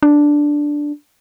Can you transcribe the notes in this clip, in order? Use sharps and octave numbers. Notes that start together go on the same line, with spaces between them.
D4